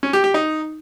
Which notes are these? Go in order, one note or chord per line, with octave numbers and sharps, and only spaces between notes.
C#4
G4
G4
D#4